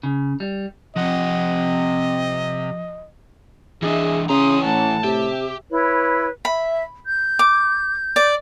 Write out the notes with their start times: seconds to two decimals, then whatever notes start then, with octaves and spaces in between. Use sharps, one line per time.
0.03 C#3
0.40 G3
0.96 C3 F3 C4 D#5 F#5
3.82 E3 D4 G#4 D#5 E5
4.29 C#3 E3 C#4 A#5 C6 D#6
4.65 A2 F#5 A5
5.04 C3 G4 E5
5.71 E4 B4 C#5
6.45 E5 B5
7.06 G6
7.39 D6
8.16 D5